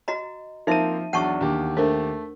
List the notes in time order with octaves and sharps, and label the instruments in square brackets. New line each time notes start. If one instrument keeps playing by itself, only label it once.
[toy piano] F#4 D#5 A#5
[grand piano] F3 D#7 [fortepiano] A#3 C4 A#4 [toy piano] D#4 E5
[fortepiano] E2 D5 [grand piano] F#3 D4 [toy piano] F#5 A5 C#6
[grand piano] D#2 G4 [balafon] D4
[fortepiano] A3 [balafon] D4 A#4 C5